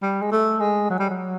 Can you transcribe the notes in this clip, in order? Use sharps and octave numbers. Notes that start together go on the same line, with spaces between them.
G3
G#3
A3
G#3
F#3
G3
F#3